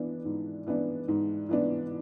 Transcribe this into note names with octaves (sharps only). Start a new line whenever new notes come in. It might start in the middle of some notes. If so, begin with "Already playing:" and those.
Already playing: E3 B3 D4
G#2
E3 B3 D4
G#2
E3 B3 D4